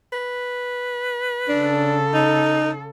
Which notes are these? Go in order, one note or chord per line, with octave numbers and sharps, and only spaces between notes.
B4
C#3 D4 A4
D#4